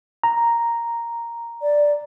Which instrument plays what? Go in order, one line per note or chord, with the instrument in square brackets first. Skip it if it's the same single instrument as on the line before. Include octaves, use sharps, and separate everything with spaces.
[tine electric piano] A#5
[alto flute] D5